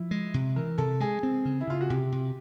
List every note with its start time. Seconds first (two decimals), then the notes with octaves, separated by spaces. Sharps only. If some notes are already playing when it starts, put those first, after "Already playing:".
Already playing: F3 E4
0.11 G#3
0.34 C3
0.56 E3 A#4
0.78 C3 A4
1.00 G#3 G#4
1.23 C4
1.45 C#3
1.61 E4
1.67 C#3 F4
1.81 F#4
1.90 C3 G4
2.12 C3